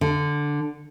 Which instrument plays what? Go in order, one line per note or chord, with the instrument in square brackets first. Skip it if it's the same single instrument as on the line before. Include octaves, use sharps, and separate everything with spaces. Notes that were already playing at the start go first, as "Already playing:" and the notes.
[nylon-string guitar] D3